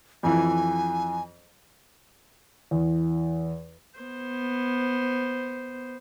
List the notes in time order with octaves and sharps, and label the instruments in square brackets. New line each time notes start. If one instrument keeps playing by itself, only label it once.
[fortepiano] F2 E3 [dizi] G#5
[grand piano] E2
[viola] B3 C5